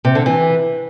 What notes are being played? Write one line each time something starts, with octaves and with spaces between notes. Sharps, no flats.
C3
D3
E3